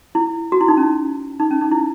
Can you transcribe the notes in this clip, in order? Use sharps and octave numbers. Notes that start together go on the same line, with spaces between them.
E4
F#4
E4
D#4
C#4
D#4
C#4
D#4
E4